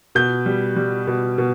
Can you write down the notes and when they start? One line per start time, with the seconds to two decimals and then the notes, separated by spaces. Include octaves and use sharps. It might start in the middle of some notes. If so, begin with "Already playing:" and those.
0.15 B2 G6
0.46 G3
0.76 G3
1.07 B2
1.38 B2